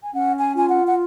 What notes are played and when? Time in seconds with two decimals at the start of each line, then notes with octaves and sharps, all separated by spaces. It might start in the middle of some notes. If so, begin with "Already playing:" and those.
0.03 G#5
0.13 C#4 F#5
0.40 G#5
0.54 F4 G#5
0.68 F#5
0.86 F#5